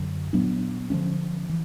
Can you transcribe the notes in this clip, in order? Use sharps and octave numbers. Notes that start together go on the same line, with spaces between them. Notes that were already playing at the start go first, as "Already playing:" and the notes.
Already playing: F#2 D3 F#3
A#2 F#3 B3 D4
D3 F3 A#3 C#4
E3